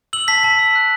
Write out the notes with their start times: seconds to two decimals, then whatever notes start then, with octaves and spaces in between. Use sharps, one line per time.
0.13 E6 F#7
0.28 A5 B6
0.43 A5 B6
0.59 E6
0.75 F#6